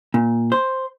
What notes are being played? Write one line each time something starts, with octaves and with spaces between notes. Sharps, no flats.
A#2
C5